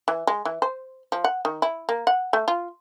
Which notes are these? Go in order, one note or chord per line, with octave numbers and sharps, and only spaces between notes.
E3
G#3
E3
C5
F3
F#5
D#3
E4
A#3
F#5
A3
F4